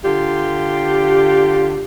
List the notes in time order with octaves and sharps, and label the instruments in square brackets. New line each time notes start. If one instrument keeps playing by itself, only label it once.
[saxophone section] D3 F4 G4